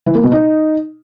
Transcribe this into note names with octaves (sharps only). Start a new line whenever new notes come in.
E3
A#3
B2
D#4